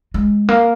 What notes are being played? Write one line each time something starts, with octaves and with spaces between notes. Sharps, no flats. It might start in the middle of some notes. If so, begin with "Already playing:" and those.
G#3
A#3